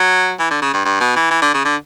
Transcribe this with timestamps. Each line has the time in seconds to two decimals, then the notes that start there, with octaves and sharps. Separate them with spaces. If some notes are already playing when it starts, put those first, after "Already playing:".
Already playing: F#3
0.40 E3
0.51 D3
0.62 C#3
0.74 G2
0.85 G2
1.00 B2
1.16 E3
1.31 E3
1.42 D3
1.54 C#3
1.65 D3